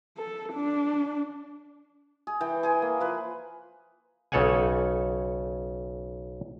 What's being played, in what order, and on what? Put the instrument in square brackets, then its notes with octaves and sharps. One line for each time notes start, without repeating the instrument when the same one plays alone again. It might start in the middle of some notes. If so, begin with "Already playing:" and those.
[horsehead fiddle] A4
D4
[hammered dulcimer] G#4
E3 G5
G#4 G#5 C6
A#3
F3 B4
[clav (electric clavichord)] B1 C#3 A4 C#5 F#5 G#5